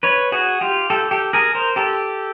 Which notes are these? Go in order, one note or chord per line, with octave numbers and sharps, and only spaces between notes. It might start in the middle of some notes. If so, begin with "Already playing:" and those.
B4 C#5
F#4 G#4
F4 G4
G4 A4
G4 A4
G#4 A#4
A#4 C5
G4 A4